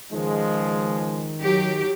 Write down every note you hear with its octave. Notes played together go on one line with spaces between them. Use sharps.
C#2 D#3 F3 G#3
F#3 G4